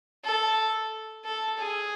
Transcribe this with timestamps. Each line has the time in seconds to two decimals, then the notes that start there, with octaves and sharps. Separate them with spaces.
0.25 A4
1.25 A4
1.58 G#4